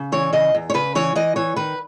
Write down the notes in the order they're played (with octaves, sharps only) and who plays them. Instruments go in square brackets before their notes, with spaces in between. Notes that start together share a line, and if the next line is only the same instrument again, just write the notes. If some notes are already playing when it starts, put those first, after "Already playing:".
Already playing: [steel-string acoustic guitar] C#3
E3 C#5
C#3 D#5
E2
C#5
C#3 B4
E3 C#5
E3 D#5
E3 C#5
D#3 B4